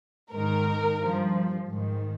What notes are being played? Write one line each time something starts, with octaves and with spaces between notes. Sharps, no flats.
G#2 D#3 A#4
G2 F3
G#2 D#3